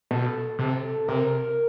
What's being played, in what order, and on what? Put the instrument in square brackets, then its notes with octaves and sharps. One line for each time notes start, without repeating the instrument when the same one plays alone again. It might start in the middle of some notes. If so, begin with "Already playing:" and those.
[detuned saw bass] B2 [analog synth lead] A4
[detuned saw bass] C3
[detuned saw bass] C3 [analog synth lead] A#4